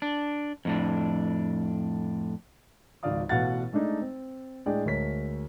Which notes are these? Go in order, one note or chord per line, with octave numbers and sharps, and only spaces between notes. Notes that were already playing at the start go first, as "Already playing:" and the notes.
D4
F2 A2 D4
G#1 C#2 F3 D5 F5 D#6
A1 B2 A3 F5 F#5 A6
G#3 A3 D4 D#4
C4
A2 G#3 D4 G#4 D5 G5
D2 G#3 A#4 C#5 B6